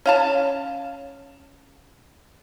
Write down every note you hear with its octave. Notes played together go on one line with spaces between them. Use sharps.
C#4 F5 A5